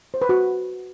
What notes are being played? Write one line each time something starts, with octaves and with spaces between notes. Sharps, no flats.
C5
B4
F#4